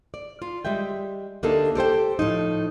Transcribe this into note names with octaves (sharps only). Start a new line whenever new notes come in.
D5
F4
G3 G#3 E5 G5
D2 A#3 D4 D#4 G4 A4
G4 A4 C5 G5
A2 F3 D#4